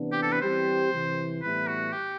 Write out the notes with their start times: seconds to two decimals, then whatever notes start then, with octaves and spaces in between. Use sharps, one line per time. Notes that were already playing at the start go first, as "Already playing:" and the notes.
Already playing: C3 E3 B3 D4
0.12 G4
0.22 A4
0.32 B4
0.42 E3 G3 C4 G4 C5
0.92 C2 C3 E3
1.42 A2 E3 G3 B3 E4 B4
1.67 F#4
1.93 G4